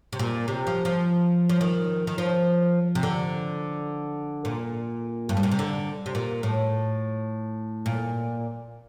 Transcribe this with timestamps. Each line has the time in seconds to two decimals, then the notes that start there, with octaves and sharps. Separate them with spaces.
0.13 C3
0.19 A#2
0.48 C3
0.67 F3
0.85 F3
1.49 F3
1.61 D#3
2.07 D#3
2.18 F3
2.95 C3
3.03 D3
4.45 A#2
5.29 G2
5.37 A2
5.43 A#2
5.52 C3
5.59 D3
6.06 C3
6.15 A#2
6.43 A2
7.86 A#2